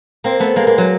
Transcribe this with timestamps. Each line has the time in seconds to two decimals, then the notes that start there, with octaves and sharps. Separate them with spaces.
0.24 A#3 C4
0.40 A3 B3
0.56 G#3 A#3
0.67 G#3 A#3
0.78 F#3